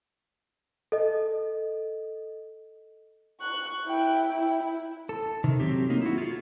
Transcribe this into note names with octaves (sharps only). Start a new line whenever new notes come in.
A4 D#5
C#6 F#6
E4 G5
E4
A4
C3 D#3
F#3 C4 G4
A#3 D#4
E4 F#4
F4 G#4